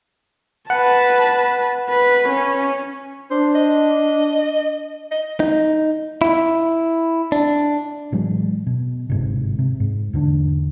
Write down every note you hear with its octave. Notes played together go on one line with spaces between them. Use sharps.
B4 F#5 A5
B4
C#4
D4 C5
D#5
D#5
D#4
E4
D4
A2 E3 F#3 G#3
B2
G1 G#2 C3
C3
G#2
E2 D3 D4